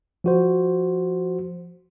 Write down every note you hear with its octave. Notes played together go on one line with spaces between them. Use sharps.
F3 F#4 C5